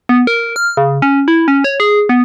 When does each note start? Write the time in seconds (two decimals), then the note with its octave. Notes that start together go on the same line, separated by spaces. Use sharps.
0.09 B3
0.27 A#4
0.56 F6
0.77 C#3
1.02 C#4
1.28 E4
1.48 C#4
1.64 C#5
1.80 G#4
2.09 B3